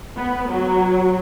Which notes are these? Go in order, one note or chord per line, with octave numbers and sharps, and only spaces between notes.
B3
F#3